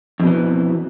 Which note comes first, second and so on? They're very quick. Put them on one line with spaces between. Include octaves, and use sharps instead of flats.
F2 B2 E3